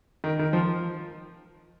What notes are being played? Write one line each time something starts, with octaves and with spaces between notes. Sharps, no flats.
D#3
D#3
F3